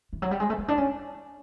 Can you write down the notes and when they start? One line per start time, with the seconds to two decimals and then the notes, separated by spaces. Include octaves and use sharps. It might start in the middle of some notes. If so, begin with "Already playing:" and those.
0.13 E3
0.22 F#3
0.31 G3
0.40 G#3
0.50 A3
0.58 B3
0.68 D4
0.78 C#4